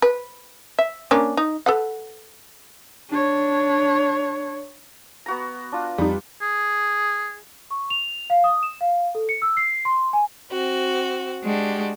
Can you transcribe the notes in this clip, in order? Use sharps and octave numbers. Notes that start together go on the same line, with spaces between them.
B4
E5
A#3 C#4 D4
D#4
A4 B4 F#5
D4 C#5
B3 F#4 A#5
D4 F4
F2 G3 D#4
G#4
C#6
F7
F5
D#6
E7
F5
A4
C#7
E6
C7
C6
G#5
C4 F#4
G#3 D4 F#4 G4